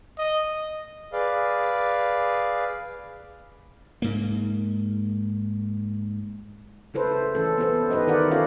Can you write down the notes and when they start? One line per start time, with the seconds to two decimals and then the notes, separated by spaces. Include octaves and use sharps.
0.19 D#5
1.13 G#4 B4 D5 F5
4.02 G#2 A#3
6.94 C#3 E4 A4 B4 C5
7.35 E3 C#4 A4
7.58 B3 E4 A4 C5
7.91 D#4 G4 B4 C5 D#5
8.07 D#3 E4 A#4 D5 F#5
8.31 C#4 E4 F4 A4 C#5 F5